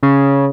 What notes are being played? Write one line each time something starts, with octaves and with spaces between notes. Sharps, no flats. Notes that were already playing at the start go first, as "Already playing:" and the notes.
C#3